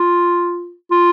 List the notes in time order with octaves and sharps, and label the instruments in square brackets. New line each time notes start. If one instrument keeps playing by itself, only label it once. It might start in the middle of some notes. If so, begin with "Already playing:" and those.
Already playing: [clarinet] F4
F4